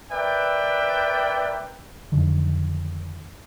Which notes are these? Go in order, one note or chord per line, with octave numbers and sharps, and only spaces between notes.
A#4 B4 D5 E5 G5
F2 D3 D#3 F#3